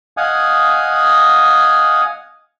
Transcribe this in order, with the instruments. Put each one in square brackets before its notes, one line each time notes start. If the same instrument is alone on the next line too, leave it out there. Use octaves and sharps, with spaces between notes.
[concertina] D#5 F5 F#5 G#5 D#6